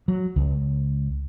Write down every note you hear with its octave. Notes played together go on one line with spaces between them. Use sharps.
F#3
C#2